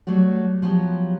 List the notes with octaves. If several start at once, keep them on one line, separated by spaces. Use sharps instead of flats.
F#3 G3 A3 F#4
F3 F#3 B3 G4